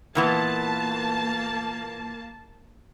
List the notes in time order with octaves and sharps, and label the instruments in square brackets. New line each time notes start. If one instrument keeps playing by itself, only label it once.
[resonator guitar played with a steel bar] A#2 E3 B3 [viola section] A#3 A5